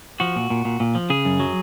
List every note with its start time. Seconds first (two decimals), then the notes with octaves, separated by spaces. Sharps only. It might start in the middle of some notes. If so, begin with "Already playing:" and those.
0.20 F3 F#4
0.36 A#2
0.50 A#2
0.65 A#2
0.80 A#2
0.95 F3
1.10 C#3 G#4
1.25 F#2
1.40 F#3